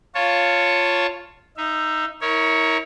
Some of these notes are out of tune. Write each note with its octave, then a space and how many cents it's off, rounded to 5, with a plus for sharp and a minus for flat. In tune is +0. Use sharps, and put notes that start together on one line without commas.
F4 +0 C#5 +0 A5 +15
D#4 +0 E5 +25
E4 -40 A#4 +0 C#5 +0